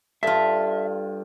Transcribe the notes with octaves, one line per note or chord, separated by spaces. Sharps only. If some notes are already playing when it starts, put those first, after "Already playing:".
G2 F4 A4 E5